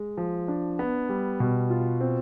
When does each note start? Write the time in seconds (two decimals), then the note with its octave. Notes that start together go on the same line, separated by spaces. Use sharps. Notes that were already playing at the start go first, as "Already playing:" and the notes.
Already playing: G#3
0.18 F3
0.48 D4
0.79 B3
1.09 G3
1.40 B2
1.70 F4
2.01 C4